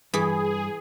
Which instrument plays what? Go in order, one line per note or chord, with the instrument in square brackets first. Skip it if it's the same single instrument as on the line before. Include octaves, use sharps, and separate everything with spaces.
[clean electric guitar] G2 [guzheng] E3 [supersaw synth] G#4